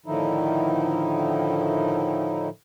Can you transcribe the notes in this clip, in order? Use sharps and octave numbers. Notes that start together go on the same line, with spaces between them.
A2 D3 D#3 F3 D#4 E4